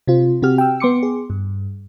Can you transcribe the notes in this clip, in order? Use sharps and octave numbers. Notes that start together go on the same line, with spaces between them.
C3 C4 F4
C3 C4 F#4 G4 F6
G5 E6
B3 C6 D6 C#7
G#4
G2